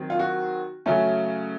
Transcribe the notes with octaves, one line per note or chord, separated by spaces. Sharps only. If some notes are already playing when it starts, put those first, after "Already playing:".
Already playing: D#3 F#3 C4
F4
F#4
C#3 F#3 A3 C#4